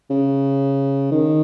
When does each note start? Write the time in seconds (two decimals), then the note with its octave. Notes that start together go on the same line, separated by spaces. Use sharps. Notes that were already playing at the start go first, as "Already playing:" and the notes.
0.10 C#3
1.11 D#3